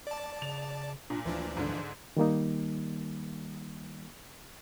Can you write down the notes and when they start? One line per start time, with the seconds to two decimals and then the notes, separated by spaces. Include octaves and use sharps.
0.07 D5 A5
0.42 C#3 F7
1.10 A#2 D4
1.26 D2 E3 F3 D4
1.57 G#2 D3
2.17 D#3 G3 A#3 D#4